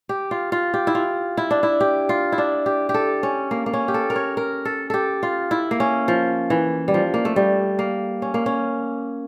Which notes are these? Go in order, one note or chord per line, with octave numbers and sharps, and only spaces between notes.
G4
F4
F4
G4
E4
F4
E4
D4
E4
G4
F4
E4
D4
G4
G4
A4
C#4
A#3
A#3
C#4
G4
A4
A#4
C#5
A#4
A4
G4 A4
F4
E4
A#3
C#4
F3
E3
G3
F3
A#3
A3
G3
A#3
C#4
A#3
C#4